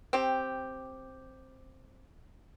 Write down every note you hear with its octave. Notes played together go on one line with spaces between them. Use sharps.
C4 G4